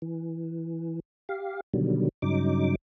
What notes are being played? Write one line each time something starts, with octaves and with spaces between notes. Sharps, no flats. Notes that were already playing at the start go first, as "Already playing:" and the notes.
E3
G4 F5
B2 D3 D#3 F#3 G3
G2 C#3 F#3 D#4 D6